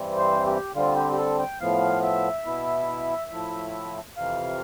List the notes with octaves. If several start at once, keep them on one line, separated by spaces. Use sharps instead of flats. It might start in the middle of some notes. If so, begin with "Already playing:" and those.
Already playing: G2 E3 G3 C4
C5
G4
D3 G3 C4 F4
G4
G4
A4
G5
A2 F3 B3 F5
E5
B2 B3 E4
A2 F3 A3 E4
F2 C3 E3 F5